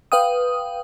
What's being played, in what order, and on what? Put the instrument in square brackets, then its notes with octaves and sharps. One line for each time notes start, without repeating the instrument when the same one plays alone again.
[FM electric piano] B4 F5 G5 D#6